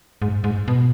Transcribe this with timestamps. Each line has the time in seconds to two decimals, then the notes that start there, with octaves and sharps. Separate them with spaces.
0.22 G#2
0.44 G#2
0.68 B2